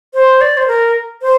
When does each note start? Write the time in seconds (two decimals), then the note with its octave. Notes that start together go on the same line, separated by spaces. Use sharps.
0.14 C5
0.41 D5
0.57 C5
0.68 A#4
1.22 C5